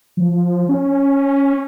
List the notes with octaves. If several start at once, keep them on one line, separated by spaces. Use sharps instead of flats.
F3
C#4